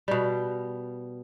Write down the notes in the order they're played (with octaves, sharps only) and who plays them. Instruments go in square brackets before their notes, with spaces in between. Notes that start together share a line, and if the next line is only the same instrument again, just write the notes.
[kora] B2 G3